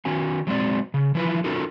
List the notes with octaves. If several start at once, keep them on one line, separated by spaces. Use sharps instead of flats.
D#3 C#4 F#4 G#5
F#3 G#3 C4 D5
C#3
E3 F3 E4 F4 B4
C#4 D#4 F4 F#4 A4 A#4